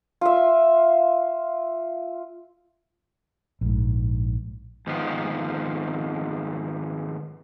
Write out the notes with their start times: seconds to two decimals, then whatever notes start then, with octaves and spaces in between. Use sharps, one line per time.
0.21 F4 E5
3.61 A#1 G#2
4.87 G#2 D#3 F3 B3